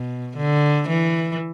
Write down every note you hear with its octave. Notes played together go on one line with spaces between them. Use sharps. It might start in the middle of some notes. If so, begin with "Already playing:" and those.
Already playing: B2
D3
E3